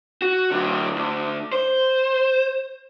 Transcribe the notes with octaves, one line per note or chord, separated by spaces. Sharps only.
F#4
D3 F#3
D2
C5